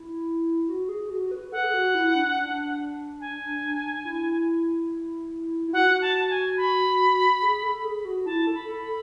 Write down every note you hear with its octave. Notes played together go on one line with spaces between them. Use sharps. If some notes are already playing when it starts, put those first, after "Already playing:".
Already playing: E4
F#4
G#4
F#4
B4
A4 F#5
G#4
F#4
E4
D4
D4
G#5
E4
E4
F#4 F#5
A5
G#5
B5
G#4
A4
G#4
F#4
E4 A5
A4
B5
A4
B5